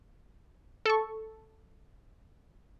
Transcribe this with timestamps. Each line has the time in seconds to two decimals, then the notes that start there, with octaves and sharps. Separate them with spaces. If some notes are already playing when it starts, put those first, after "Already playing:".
0.86 A4 C#6